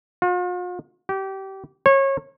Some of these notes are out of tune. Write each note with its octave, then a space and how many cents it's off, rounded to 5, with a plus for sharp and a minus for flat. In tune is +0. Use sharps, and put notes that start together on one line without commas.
F4 +45
G4 -25
C#5 -25